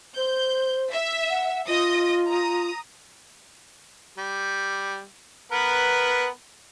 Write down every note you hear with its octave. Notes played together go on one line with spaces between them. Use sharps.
C5 G6
E5
F#5
F4 D#5 D#6 A#6
A#5 D#6
G3
B3 A#4 B4